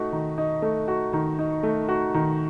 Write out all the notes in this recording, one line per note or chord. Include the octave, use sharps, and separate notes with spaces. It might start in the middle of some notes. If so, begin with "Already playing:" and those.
Already playing: A3 D#4 F#4
D#3
D#4
A3
F#4
D#3
D#4
A3
F#4
D#3